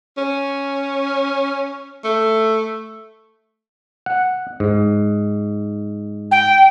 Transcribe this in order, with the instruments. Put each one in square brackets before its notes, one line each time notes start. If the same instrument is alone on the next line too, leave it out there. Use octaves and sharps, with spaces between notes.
[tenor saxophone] C#4
A3
[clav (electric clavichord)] F#5
G#2
[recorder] G5